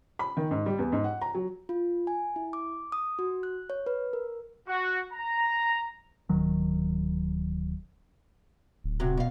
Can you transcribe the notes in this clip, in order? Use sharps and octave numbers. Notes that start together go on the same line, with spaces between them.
B5
D#3
G#2
G3
E2
G#2
F#5
A#5
F#3
F4
G#5
E4
D6
D#6
F#4
F#6
C#5
B4
A#4
F#4
A#5
D1 D#3 F#3
D1
C3 F#3
B2 F5